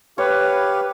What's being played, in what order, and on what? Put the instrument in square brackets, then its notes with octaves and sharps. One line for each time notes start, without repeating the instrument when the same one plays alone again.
[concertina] G4 F5 [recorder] B4 [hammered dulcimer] C#5